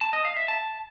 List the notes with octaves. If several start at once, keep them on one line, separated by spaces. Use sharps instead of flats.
A5
D#5
F5
E5
A5